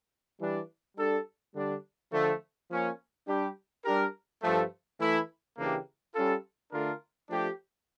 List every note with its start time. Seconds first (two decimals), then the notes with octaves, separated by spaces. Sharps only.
0.40 E3 G3 D4
0.97 G3 D4 A4
1.54 D3 G3 D4
2.12 D3 F3 A3
2.69 F3 A#3 C#4
3.27 G3 D4 G4
3.84 G3 D4 G4 A#4
4.42 G2 F3 A3
4.99 E3 A3 E4
5.57 C#3 E3 A#3 D4 G4
6.14 G3 C#4 F4 A4
6.71 D3 A3 D4 F4 A#4
7.29 F3 A3 D4 G4